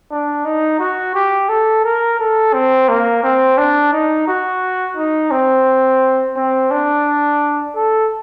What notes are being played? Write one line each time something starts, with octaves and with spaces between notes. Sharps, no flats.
D4
D#4
F#4
G4
A4
A#4
A4
C4
A#3
C4
D4
D#4
F#4
D#4
C4
C4
D4
A4